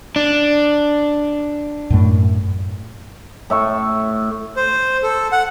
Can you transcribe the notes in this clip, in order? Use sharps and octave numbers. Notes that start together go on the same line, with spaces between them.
D4
F#2 A2 A3
A2 E5 C#6
C5
A4
F#5